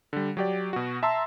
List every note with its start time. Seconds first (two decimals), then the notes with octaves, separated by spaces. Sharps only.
0.13 D3 G3
0.37 F#3 G4 D5
0.73 B2 F#4
1.03 E5 A5 A#5 C6 E6